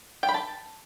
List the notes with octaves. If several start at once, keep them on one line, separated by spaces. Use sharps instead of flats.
G5
B5
A5